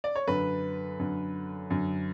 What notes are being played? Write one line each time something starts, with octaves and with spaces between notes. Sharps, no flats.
D5
C#5
F#2 D3 B4
F#2 D3
F#2 D3